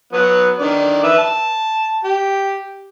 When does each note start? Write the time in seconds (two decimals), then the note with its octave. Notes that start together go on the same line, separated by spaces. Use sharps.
0.13 F#3 B3 B4
0.59 D3 D#3 D5
1.04 B4 E5
1.18 A5
2.04 G4